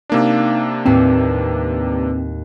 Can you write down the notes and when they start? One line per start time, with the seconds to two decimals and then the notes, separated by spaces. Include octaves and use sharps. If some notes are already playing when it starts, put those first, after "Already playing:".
0.10 C3 A#3 D4 D#4 F5
0.86 D#2 A2 C4 B4